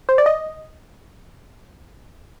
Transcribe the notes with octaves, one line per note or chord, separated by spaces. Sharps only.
C5
D5
D#5